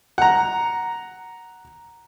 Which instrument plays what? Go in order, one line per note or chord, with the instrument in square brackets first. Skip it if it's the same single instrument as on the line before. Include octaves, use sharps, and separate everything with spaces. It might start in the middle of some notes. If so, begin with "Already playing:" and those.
[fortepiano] F#5 A#5